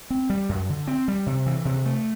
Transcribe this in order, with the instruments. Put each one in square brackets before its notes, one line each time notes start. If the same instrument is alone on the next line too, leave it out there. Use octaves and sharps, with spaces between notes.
[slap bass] C4
G3
F#2
D3
C4
G3
C3
E3
C3
A3